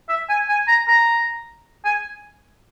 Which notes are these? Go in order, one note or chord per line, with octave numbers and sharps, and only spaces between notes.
E5
G#5
G#5
A#5
A#5
G#5